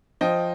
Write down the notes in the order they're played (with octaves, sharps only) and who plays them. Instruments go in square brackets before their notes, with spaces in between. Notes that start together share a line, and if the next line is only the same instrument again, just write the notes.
[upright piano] F3 D#5 G5